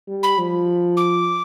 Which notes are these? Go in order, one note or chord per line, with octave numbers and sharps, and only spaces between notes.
G3
B5
F3
D6